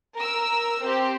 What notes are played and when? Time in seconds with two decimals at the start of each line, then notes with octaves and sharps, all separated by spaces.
0.17 A#4 E6
0.83 C4 G4